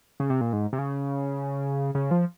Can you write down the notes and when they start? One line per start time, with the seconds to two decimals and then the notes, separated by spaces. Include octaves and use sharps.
0.20 C#3
0.30 C3
0.41 A#2
0.53 G#2
0.73 C3
0.79 C#3
1.95 C#3
2.11 F3